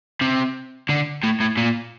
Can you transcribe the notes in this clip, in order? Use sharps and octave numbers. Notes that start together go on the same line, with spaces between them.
C3
D3
A2
A2
A#2